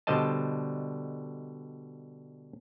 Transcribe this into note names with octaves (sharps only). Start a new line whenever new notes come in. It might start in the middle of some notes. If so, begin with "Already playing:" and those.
B2 D3 G3 C5 D#5 A5